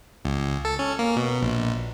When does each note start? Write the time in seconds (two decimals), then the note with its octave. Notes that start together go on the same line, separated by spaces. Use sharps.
0.25 C#2
0.65 A4
0.79 C#4
0.99 A#3
1.16 B2
1.42 A#1